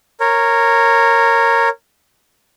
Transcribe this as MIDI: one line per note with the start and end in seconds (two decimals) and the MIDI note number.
0.20 1.69 70
0.20 1.69 73